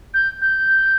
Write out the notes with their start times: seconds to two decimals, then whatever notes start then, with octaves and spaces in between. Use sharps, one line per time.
0.14 G6
0.41 G6